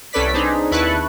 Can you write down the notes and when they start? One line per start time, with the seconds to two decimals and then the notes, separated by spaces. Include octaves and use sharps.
0.13 C2 C#4 A4 B4 D5 B6
0.34 C4 D4 D#4 G#4
0.71 D#2 E4 B4 A5 C#6 F#6